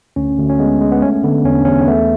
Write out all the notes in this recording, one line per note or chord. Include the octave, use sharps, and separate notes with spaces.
D2 C#4
D2
C#4
G#3 B3
G#3
B3
A3 C#4
D3 B3
E2 C#4
D4
E2 C#4
C#4
A3 B3